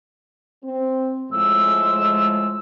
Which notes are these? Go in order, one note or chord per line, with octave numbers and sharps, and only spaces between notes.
C4
A2 F3 G#3 E6